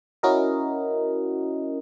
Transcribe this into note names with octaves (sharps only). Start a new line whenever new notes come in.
C#4 E4 F#4 A#4 D#5